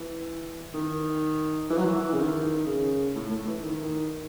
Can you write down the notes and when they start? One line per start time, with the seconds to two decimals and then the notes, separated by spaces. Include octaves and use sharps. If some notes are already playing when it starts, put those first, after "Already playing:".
Already playing: E3
0.74 D#3
1.70 E3
1.78 F#3
1.86 E3
2.13 C#3
2.19 D#3
2.67 C#3
3.15 A2
3.31 A2
3.47 E3
3.63 D#3